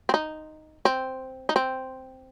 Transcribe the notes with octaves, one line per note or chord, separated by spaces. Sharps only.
C4
D#4
C4
D#4
C4